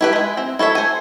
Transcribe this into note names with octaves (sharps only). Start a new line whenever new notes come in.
E4 G4 B4
G#3 E4
C4
E4 A4 C#5 E5
C5 G#5